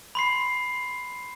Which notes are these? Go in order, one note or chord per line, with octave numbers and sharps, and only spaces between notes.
B5 C6 C7